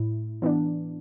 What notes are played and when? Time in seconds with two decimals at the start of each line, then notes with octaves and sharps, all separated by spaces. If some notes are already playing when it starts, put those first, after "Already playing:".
Already playing: A2 E4
0.42 E3 B3 D4